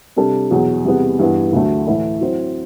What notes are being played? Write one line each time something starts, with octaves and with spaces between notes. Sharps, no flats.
C3 G3 D4 A4
E2 B2 F#3
E2 C3 G3 B3
G2 E3 B3
D2 D3 F#3 A3
A2 E3 A3 E4 A4
F#3 C4 E4